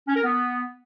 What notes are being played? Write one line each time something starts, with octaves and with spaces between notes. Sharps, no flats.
C#4
A#4
B3